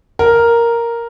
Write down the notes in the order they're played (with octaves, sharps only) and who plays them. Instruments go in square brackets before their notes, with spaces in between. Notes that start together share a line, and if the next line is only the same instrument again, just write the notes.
[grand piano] A#4